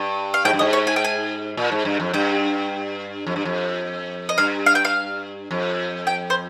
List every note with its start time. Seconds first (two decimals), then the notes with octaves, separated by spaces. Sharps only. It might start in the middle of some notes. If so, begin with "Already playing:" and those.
Already playing: G2
0.34 F5
0.45 G#2 G5
0.53 G2
0.59 G#2 D#5
0.73 C#5
0.87 G#5
0.96 G5
1.04 G#5
1.57 A#2
1.72 G#2
1.85 G2
2.00 F2
2.13 G2 G5
3.26 F2
3.36 G2
3.45 F2
4.29 D#5
4.38 G2 F5
4.66 F5
4.75 G5
4.85 F5
5.51 F2
6.07 G5
6.30 C5